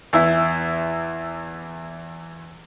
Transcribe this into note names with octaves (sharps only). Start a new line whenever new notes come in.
E2 E4 E5